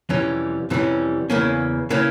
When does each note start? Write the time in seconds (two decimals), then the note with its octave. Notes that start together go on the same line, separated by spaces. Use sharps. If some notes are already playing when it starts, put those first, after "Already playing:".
0.09 F2 C3 E3 G3 C#4
0.70 F2 C3 E3 G3 C#4
1.30 E2 C#3 E3 A#3 C#4
1.90 C#3 E3 A#3 C#4